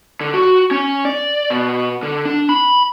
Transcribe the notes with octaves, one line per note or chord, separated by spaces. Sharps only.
D3
F#4
C#4
D5
B2
D3
D4
B5